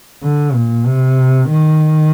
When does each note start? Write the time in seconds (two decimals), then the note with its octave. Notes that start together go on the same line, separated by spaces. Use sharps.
0.23 D3
0.54 A#2
0.86 C3
1.50 D#3